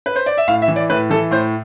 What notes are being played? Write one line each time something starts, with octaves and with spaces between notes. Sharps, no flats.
B4
C5
D5
E5
A2 F5
E5
E3
D5
A2 B4
E3 A4
A2 C5